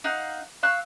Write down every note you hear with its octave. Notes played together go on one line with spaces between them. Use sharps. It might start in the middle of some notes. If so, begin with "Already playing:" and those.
D#4 F5 F#5
F5 C#6 E6 F#6